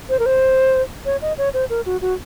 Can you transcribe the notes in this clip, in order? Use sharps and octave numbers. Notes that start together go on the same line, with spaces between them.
C5
A#4
C5
C#5
D#5
C#5
C5
A#4
F#4
F#4